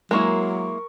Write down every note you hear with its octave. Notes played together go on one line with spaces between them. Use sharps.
F#3 G#3 A#3 E4 A#4 C#6